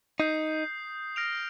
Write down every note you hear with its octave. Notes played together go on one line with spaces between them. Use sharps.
D#4 D#6 G6 C7
F6 A#6 D7 F7